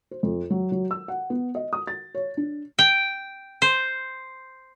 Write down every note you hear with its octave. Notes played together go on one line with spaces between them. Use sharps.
C5
F2
F#3
F#3
E6
F#5
B3
D#5
D#6
A6
C#5
D4
G5
C5